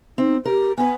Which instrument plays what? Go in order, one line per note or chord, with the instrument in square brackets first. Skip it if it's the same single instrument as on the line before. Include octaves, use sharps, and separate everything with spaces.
[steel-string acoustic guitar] C4 [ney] D#4
[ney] G4 [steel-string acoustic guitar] A#4
[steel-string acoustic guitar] B3 B4 [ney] G#5